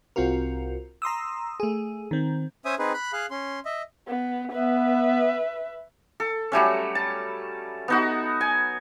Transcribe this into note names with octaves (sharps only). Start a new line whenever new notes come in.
C2 C4 F4 F#4 A#4
A#5 C6 D#6 E6
A3 G#4
D#3 C4
C#4 C5 E5 G#5 D#6
C4 D#4 G#4 B4
B5 F#6
G#4 F5 F#6
C#4 C6
D#5 E5
B3
B3 B4 E5
A4
F#3 G3 A3 C#4
A5
B3 D#4 F#4
G#5